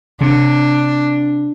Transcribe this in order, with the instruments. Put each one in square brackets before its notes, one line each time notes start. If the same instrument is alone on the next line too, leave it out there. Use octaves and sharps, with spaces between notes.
[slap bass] C3 [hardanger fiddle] D4